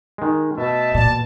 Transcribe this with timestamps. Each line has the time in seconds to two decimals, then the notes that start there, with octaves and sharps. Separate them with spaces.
0.18 D#3 G#3
0.58 B2 A3 D#5 E5 A5
0.94 E2 A#2 D5 A5